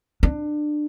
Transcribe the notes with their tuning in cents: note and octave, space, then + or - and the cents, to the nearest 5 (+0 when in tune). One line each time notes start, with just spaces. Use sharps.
D4 +25